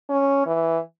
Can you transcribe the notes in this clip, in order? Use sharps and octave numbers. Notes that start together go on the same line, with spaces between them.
C#4
E3